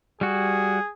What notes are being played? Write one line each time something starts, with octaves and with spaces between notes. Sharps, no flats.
G3 F#4 G#4